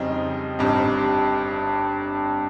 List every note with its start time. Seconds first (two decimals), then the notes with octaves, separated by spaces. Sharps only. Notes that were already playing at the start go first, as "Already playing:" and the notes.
Already playing: F2 C#3 G3 C4 D#4
0.59 G1 G2 G3 C4 D#4